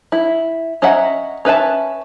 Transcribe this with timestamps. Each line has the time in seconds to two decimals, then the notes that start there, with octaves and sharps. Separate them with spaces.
0.12 E4
0.82 C#4 D#5 E5 F#5 A#5
1.45 C#4 B4 E5 A5